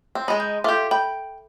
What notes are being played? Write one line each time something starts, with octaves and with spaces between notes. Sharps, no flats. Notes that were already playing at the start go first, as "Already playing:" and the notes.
C4
G#3 D#4 B5
G6
F4 G4 A4 E5 D6
G5 B5